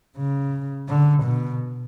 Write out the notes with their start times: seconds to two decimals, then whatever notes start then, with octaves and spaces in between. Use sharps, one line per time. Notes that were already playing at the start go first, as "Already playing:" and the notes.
0.17 C#3
0.89 D3
1.24 B2